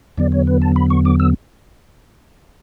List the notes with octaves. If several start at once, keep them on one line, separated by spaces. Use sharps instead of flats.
E2 D3 F#3 B3 D5
C#5
B4
A5
B5
C#6
D6
E6